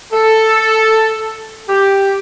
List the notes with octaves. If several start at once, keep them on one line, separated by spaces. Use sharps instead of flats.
A4
G4